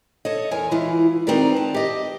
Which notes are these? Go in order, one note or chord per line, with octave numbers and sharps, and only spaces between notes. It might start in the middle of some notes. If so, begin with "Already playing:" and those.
A4 C#5 D#5
E2 A#4 C#5 G#5
E3 G#3 E4 F4
D#3 C4 F#4 A#4 B4 D5
A5
G4 D#5